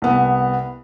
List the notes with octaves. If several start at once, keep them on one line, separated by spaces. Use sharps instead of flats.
C2 B3